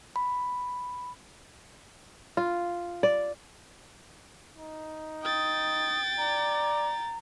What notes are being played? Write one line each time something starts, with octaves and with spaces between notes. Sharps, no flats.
B5
F4
D5
D#4
G5 D#6 A6
D5 A#5